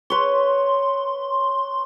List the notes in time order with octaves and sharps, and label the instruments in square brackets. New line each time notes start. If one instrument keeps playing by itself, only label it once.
[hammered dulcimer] B4 C#5 [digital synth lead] C6